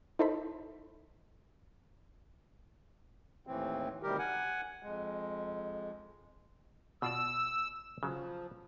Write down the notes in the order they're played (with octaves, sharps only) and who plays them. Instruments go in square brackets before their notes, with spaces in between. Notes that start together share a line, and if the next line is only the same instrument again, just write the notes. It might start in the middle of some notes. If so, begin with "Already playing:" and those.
[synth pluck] D#4 E4 A4 C5 B5
[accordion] D#2 A2 E3 C4
D2 C3 D#3 G3 G4 A#4
F#5 G#5
F2 G#3
[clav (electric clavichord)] B2 F4 D5 [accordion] E6
[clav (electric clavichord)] C#3 F#3 [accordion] F3